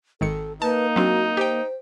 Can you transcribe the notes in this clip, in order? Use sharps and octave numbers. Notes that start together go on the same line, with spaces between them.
G#1 D#3 A4 C#7
A#3 D#4 B4 A5
F#3 C4 D4 F#4
G4 C5 G5